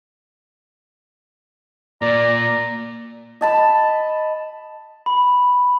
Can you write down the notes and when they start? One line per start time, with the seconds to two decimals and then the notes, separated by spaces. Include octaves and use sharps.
2.02 A#2 A#3 D5 A#5
3.41 D#5 A5 B5
5.06 B5